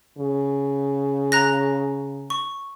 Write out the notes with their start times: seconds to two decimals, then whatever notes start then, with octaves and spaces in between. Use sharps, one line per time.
0.18 C#3
1.32 A#5 F#6 A#6
2.30 C#6